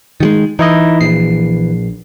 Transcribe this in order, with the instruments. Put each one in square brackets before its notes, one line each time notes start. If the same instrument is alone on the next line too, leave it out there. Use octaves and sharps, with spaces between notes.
[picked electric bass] D#3 F#3 G#3
[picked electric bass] E3 [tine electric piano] D#4 E4 D#5
[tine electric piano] A#1 C7